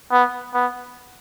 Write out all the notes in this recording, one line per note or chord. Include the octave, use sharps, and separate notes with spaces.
B3
B3